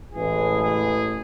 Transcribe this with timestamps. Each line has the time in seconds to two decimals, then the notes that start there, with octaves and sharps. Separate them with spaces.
0.12 A1 A2 E3 G#3 G#4
0.62 G#4